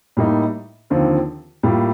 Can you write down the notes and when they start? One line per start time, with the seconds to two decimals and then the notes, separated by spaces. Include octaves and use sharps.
0.17 A2 G3 A#3 D#4
0.90 D#2 D3 F3 C4 F4
1.63 A2 G3 A#3 F4